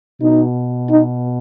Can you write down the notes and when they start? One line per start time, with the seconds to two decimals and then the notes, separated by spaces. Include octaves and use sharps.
0.21 B2 D#4
0.90 D#4